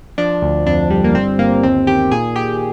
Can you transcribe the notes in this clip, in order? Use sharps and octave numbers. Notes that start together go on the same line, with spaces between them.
F3 D4
D2
F2 D4
G3
A#3
G1 C4
G1 A#3
D#2 C4
D#3 G4
A#2 G#4
A#2 G4